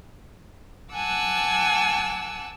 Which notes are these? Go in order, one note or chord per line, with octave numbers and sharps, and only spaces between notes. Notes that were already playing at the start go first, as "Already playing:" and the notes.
F#5 G#5 A5 D6 E6 F#6